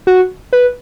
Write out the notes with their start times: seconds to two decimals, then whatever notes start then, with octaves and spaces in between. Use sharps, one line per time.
0.07 F#4
0.53 B4